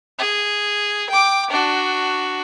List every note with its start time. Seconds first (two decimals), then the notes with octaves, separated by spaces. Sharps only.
0.19 G#4
1.10 G5 D6
1.50 D4 F#4